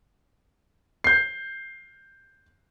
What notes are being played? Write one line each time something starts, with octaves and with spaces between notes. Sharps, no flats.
G6 C7